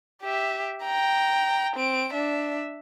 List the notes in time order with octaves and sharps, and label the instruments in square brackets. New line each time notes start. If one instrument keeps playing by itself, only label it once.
[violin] G4 E5
G5 A#5
C4 D7
D4 E5